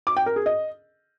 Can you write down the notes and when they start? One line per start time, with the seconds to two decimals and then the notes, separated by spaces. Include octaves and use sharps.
0.07 D6
0.17 G5
0.26 A#4
0.36 G#4
0.46 D#5